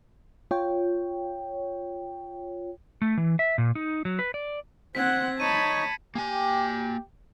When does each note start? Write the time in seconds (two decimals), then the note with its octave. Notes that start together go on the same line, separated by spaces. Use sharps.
0.51 F4 C#5 G5
3.02 A3
3.17 E3
3.39 E5
3.58 A#2
3.75 D#4
4.05 F#3
4.19 B4
4.34 D5
4.95 C4 C5 F#5 G#6 B6
5.40 D#4 C#5 A5 B5 C#7 D#7
6.15 A#3 G4 G#5